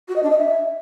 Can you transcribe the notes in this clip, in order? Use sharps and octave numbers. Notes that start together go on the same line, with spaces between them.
F#4
D#5
D4
D#5
E5